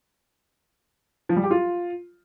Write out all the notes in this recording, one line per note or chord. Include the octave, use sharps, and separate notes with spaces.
F3
G3
G4
F4